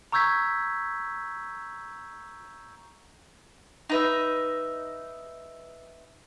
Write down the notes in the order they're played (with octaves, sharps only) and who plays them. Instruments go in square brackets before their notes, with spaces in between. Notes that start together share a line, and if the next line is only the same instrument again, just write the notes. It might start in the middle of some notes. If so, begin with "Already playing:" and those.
[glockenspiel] A#5 C#6 E6 G6 G#6 B6
[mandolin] D#4 B4 E5